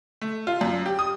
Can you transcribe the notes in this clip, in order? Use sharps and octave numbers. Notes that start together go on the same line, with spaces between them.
A3
F4
F#2
G4
D#6